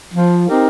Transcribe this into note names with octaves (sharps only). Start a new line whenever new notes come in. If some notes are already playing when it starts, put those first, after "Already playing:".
F3
C4 D#4 G4 A#4